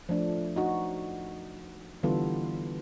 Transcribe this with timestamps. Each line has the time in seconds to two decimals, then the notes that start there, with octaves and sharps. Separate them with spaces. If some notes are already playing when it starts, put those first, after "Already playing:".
0.09 F3 A3 D4
0.56 D#4 F#4
2.03 D3 E3 G3 B3 F4 A4